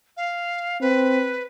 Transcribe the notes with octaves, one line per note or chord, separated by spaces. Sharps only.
F5
C4 B4